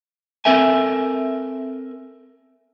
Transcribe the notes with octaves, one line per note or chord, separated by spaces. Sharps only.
C4 A4 A#4 E5 G#5